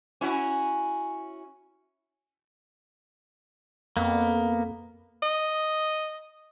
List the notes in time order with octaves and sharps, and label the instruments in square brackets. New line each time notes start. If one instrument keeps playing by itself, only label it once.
[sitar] C#4 E4 F#4
[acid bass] F2 [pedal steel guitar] A#3 B3
[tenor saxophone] D#5